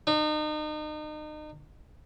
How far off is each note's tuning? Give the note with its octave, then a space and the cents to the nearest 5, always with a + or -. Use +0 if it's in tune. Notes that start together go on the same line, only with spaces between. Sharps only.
D#4 -35